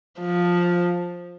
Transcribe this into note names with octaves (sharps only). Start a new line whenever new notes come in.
F3